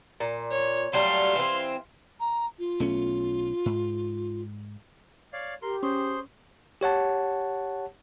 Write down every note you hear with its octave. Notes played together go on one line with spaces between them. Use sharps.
A#2
C#5
F#3 G3 A3 F5 C6
E3 C4
A#5
F4
B1 A3 C#4
G#2
C#5 D5 F5
G4 A#4 C6
C#4 G#4 C5 C6
G4 C#5 F#5 A5